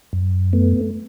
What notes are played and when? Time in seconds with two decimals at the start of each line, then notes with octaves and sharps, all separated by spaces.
0.13 F#2
0.53 A3 B3